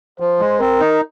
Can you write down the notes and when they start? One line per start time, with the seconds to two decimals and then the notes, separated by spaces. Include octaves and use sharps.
0.20 F3 C5
0.40 G#3
0.60 C4 A#4
0.80 D#4